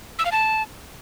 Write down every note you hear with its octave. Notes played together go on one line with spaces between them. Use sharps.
E6
F5
A5